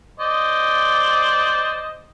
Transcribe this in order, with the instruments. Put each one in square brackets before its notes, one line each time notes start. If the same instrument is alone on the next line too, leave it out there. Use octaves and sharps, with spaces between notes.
[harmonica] C5 D5 D#5